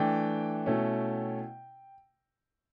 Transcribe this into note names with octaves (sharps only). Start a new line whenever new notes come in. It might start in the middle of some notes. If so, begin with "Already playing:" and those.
Already playing: E3 A3 D4 G5
B2 A3 C#4 E4